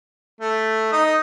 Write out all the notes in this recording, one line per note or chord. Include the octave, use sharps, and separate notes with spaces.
A3
D#4 D#6